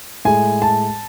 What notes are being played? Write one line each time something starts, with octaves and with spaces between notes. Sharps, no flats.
A2 G#3 G#5
A5